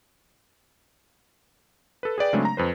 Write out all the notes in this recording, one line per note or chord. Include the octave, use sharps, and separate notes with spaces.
A4 B4
G#4 B4 D5 G5
C#3 F#3 G#3 A3 C4 D4
A#5
F2 B4 C5